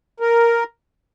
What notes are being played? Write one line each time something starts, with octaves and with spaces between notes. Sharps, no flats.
A#4